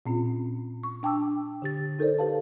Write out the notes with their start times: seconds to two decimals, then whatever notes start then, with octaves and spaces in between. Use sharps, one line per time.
0.06 A#2 C4 C#4 F4
0.83 C#6
1.03 D4 G5 A5 D6 E6
1.62 D3 G4 A6
1.99 D#4 A4 A#4 C5 D5
2.19 G4 B4 F5 A5